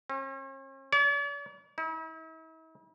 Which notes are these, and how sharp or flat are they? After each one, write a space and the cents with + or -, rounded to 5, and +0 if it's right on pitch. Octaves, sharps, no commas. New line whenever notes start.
C#4 -45
D5 -45
E4 -45